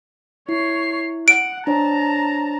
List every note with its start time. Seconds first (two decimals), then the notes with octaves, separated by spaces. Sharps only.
0.49 E4 C#5 C7
1.28 F#5 D7
1.67 D4 C5 C#5 A5 A#5